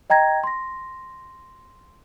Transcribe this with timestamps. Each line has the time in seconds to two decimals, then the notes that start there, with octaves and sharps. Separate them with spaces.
0.10 D#5 G5 A#5 G#6 A#6
0.44 C6 A#6